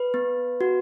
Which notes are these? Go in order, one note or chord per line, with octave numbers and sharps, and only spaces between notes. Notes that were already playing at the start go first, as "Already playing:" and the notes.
Already playing: B4
B3
F#4